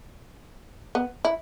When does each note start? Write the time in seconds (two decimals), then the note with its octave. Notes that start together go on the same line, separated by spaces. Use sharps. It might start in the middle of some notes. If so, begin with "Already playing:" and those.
0.95 B3
1.25 E4